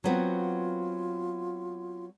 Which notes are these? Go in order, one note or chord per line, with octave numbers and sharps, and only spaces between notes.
F#3 B3 C4 F4